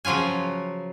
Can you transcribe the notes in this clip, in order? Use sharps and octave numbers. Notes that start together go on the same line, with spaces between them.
C#3 F3 F#3 F4 G#5